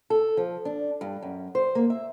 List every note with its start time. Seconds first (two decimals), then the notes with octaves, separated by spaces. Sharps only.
0.10 A4
0.37 F3
0.65 D4
1.01 G2
1.22 F#2
1.55 C5
1.75 A#3
1.90 E5